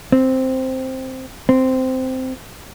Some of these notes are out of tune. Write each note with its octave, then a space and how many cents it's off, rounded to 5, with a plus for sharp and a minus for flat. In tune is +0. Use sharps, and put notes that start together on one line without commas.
C4 +0
C4 -10